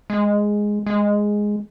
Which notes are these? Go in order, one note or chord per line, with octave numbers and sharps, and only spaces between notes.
G#3
G#3